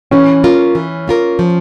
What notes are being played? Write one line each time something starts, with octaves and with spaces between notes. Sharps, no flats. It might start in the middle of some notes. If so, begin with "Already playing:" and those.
E3 C#4
A#3 F4 A#4
E3
A#3 F4 A#4
F3